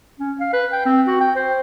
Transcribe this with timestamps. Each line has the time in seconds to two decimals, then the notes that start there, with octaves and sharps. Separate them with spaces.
0.19 C#4
0.40 F5
0.53 B4
0.72 G5
0.86 C4
1.07 F#4
1.20 G5
1.36 C5